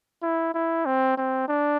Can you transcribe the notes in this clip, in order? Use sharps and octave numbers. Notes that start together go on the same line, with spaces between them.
E4
E4
C4
C4
D4